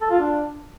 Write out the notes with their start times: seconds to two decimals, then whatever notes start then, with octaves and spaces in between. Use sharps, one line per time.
0.01 A4
0.11 F4
0.20 D4